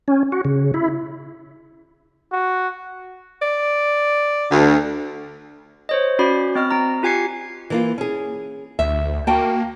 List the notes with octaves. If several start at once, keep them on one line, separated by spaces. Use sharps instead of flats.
C#4
F#4
C#3
E4
F#4
D5
D2
C5 C#5 D#5
C#4 F#4 D5 B5
C4 D#5 F6
C4 A#5
F4 G4 G#5 G#6 C7 C#7
E3 A#3 F4
C#4 G#4
D2 E5
A#3 F#4 G5 A5